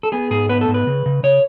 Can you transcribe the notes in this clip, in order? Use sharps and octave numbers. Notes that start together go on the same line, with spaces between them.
A4
B3 G#4
G#2 G#4
B3 B4
A4
G#2
B4
C#3
C#3
C#3 C#5